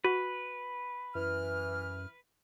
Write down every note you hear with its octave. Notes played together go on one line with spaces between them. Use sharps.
F#4 B4
F#2 E3 F6